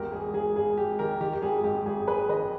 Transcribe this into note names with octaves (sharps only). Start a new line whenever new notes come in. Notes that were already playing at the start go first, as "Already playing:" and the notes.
Already playing: G#1 E2 G4 A#4
G#2 G#4
G#1 G#4
G#1 G#4
G#1 G4
D#3 G4 A#4
D#3 G4
G4
G#1 G#4
G#2 G4
G#1 G#4
G#1 G#4 B4
D#3 B4 D#5